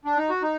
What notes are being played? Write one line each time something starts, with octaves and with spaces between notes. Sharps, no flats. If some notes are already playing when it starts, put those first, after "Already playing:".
D4
D#4
F#4
D#4